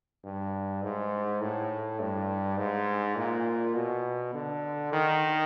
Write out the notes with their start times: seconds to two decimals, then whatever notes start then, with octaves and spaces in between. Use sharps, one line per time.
0.24 G2
0.83 G#2
1.41 A2
2.00 G2
2.58 G#2
3.17 A#2
3.75 B2
4.34 D3
4.93 D#3